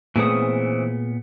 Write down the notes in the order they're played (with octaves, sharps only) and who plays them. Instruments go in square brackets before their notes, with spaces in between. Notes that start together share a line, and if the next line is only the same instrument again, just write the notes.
[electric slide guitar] A#2 B3 [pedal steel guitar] E3 C4 D#6 [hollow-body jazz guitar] A3 G#4 C#5